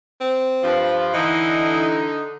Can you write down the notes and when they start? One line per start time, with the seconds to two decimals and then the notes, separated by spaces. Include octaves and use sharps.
0.20 C4
0.63 G2 F3
1.13 D3 E3 D#4